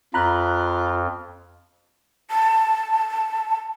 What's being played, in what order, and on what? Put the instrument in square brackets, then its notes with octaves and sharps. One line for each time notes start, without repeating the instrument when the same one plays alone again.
[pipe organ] F2 [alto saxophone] F4 [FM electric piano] A#5 B5 F#6
[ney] A5